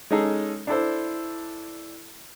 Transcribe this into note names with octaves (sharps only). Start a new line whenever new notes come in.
G#3 C#4 D#4 G#4 A4
D4 E4 A4 C5